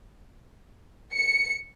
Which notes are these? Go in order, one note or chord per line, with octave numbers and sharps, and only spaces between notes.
C#7